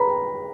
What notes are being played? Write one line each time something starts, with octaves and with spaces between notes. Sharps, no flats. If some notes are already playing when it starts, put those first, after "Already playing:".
Already playing: B4 A#5 B5